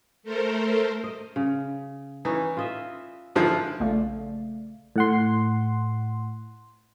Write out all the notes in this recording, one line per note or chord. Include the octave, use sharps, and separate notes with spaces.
A3 A4 A#4 C5
D#5
C#3
E3 C#4 D#4
F4 D#5 E5
G#2 D3 F3 E4 F4 A#4
A#1 C#3 A3 D5 F5
A2 F#5 C6